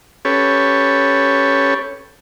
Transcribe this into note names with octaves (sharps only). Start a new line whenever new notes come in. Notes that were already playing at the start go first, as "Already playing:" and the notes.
C#4 G4 A4 B4 C#5